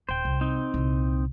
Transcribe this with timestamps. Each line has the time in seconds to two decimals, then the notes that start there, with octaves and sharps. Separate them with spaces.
0.09 D#1 C5 G5
0.25 C2
0.41 C4 D#4
0.74 C2 A#2